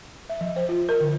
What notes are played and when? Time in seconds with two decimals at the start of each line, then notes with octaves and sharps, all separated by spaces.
0.30 E5
0.41 F3
0.56 C5
0.69 F4
0.89 A#4
1.01 D3